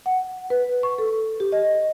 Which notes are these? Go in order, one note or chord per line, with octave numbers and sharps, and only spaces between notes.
F#5
B4
C#6
A4
G4
D#5